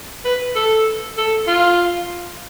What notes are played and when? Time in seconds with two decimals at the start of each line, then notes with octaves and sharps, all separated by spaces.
0.25 B4
0.55 A4
1.17 A4
1.47 F4